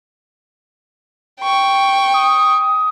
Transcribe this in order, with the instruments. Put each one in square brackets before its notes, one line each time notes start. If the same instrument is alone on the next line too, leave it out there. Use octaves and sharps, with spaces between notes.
[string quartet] G5 C#6
[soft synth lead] D#6